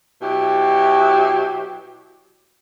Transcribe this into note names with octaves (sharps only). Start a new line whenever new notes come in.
B2 F#3 E4 G4